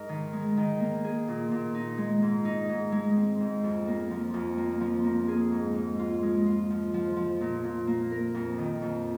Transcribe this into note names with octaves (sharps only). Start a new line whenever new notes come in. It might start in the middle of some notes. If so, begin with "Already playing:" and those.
Already playing: G#2 D#4 A#4
D#3
G#3
D#3
A#3
G#4
A#2
A#2
D#4
G#3
G#2
D#4
G#2
G#3
C4
G#2
F2
A#3
F3
F2
A#3
F3
A#3
G#4
G#2
G#2
F4
G#3
F4
F3
F3
F3
A#2
A#2
A#3
A#4
F2
D#3
F2